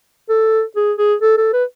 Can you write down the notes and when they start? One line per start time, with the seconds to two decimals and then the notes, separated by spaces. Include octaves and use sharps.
0.29 A4
0.76 G#4
0.98 G#4
1.22 A4
1.37 A4
1.53 B4